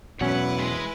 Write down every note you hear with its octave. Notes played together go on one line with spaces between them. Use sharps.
E2 B2 F#3 C#4 E4 B4 F#5
G#3